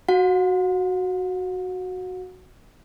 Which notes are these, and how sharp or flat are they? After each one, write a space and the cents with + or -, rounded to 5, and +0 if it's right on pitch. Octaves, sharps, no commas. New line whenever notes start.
F#4 +0 F#5 -45